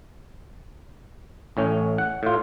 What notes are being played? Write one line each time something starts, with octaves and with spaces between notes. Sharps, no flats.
A1 A2 C#4
F#5
A2 F4